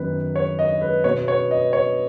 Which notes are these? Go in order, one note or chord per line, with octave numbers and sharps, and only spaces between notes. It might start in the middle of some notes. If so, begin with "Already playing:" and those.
Already playing: F#2 D#3 B3 B4
C#5
D#5
B4
B2 B3 C#5
C#5
D#5
C#5